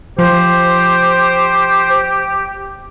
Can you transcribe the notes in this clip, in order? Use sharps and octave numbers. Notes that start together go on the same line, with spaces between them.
F3 G4 C5